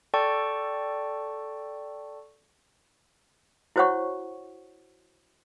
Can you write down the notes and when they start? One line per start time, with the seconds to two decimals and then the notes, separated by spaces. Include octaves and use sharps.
0.14 A4 D5 G5 A5 C#6
3.76 E4 F#4 C5 C#5 F#5 C#6